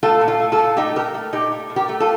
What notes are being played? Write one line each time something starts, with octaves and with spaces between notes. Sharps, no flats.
A3 F4 A4
A#2
F4 A4
A3
F4 A4
A#2
A3 D#4 G4
A#2 G4 A#4
A3
A#2 D#4 G4
A3
A#2
G4 A#4
A3
F4 A4